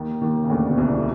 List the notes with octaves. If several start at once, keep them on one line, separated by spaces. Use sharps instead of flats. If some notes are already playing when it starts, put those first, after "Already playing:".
Already playing: D#2 D#3
D#2 D#3
C#3
D2 D3
B2
C2 C3
D3